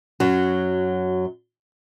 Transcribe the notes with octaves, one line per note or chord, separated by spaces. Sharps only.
F#2 F#3